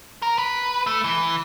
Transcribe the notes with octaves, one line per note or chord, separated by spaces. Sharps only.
A#4
B4
A3
E3